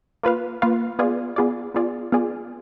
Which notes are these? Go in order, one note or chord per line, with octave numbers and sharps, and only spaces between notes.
A#3 F4 B4 F5
A#3 F4 B4 F5
B3 F4 G#4 D5
B3 F4 G#4 D5
B3 F4 G#4 D5
B3 F4 G#4 D5